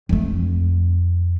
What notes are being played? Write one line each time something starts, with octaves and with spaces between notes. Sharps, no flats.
F2 A3